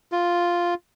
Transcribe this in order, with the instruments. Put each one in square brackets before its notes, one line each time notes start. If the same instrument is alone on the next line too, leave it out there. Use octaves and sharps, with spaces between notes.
[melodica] F4